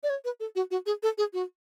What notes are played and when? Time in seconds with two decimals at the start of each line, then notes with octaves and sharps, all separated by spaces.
0.03 D5
0.10 C#5
0.25 B4
0.40 A4
0.56 F#4
0.71 F#4
0.86 G#4
1.03 A4
1.18 G#4
1.33 F#4